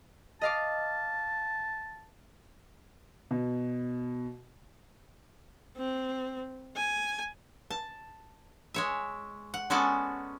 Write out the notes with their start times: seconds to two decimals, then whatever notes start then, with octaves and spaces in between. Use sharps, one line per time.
0.41 D#5 F5 A5 D6
3.31 B2
5.77 C4
6.76 G#5
7.70 A5
8.74 G#3 C#5 E5
9.54 F#5
9.70 G#3 B3 C#4 F#4 A4 D5